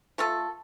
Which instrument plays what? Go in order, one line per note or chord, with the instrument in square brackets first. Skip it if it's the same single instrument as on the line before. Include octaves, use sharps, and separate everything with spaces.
[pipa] A3 F4 A4